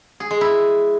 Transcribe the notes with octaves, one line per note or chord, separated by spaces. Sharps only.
G#4
G#3
E4